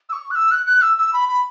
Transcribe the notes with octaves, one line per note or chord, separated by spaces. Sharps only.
E6
C#6
F#6
E6
F#6
F#6
E6
E6
B5
B5